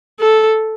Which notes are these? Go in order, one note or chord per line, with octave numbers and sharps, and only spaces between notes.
A4